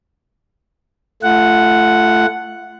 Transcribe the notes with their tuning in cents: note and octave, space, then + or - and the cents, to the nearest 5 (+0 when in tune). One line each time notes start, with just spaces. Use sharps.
A3 +0 F4 -35 F#5 +0